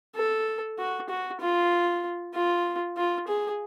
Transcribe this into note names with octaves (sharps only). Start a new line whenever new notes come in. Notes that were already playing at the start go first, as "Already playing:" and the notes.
A4
F#4
F#4
F4
F4
F4
G#4